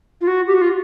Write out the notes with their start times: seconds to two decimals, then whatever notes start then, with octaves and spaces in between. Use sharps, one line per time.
0.21 F4
0.27 F#4
0.46 G4
0.54 F#4
0.61 F4